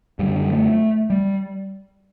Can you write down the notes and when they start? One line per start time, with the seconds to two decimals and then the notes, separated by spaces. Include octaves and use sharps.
0.19 F#2 D3 G3
0.52 A3
1.10 G3